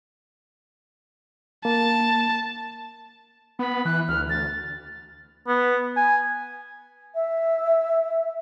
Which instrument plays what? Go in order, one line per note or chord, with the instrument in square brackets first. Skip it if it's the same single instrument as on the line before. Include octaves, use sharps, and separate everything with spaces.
[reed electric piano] A#3 [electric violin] A5
[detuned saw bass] B3 [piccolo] B5
[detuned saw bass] E3 [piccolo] F#6
[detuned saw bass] D2 [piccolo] F6
[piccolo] A6
[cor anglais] B3
G#5
[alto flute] E5